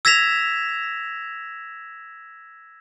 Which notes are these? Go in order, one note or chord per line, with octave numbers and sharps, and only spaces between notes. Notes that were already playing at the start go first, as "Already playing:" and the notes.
E6 G#6 A#6 B6 E7 F7